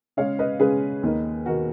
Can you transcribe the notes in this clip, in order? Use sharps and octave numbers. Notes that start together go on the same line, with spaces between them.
C#3 G#3 C#4 C#5 F5
B4 D#5
C#3 G#3 C#4 G#4 B4
D#2 D#3 A#3 D#4
D#3 A#3 D#4 F#4 A#4